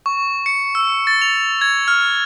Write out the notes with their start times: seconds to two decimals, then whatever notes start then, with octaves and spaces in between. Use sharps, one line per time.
0.06 C#6
0.46 C#7
0.75 E6
1.07 A6
1.22 F7
1.61 G#6
1.88 F6